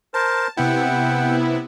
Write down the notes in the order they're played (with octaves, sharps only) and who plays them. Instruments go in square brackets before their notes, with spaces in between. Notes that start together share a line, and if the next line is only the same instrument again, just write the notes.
[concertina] A#4 C5 [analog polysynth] A5
[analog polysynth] C3 B3 E4 [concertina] F#5 G5